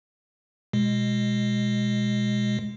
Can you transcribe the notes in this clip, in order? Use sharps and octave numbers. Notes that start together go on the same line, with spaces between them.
B2 G#3